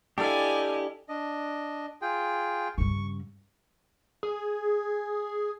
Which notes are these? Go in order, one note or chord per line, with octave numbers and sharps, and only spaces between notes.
D4 E4 G4 A4 D#5 F5 G#5
D4 D#5
F4 G#4 G5
G2 C#3 C#6
G#4